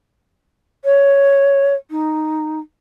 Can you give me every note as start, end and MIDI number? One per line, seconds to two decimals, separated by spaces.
0.85 1.74 73
1.91 2.59 63